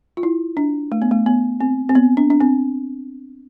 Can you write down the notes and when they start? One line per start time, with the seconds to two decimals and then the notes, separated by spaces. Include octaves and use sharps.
0.17 F4
0.23 E4
0.57 D4
0.92 A3
1.02 B3
1.11 A3
1.26 B3
1.61 C4
1.89 C4
1.95 B3
2.17 D4
2.30 D4
2.40 C4